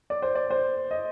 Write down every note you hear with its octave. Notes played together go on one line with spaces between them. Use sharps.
D5
C5
D5
C5
D#5